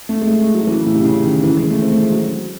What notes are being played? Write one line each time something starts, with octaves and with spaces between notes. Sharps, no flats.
A3
G#3
A3
G#3
F#3
E3
C#3
A2
C3
C#3
D#3
E3
G#3
A3
C4
A3
G#3
F#3